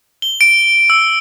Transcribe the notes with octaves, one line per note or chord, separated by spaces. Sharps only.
G7
D7
E6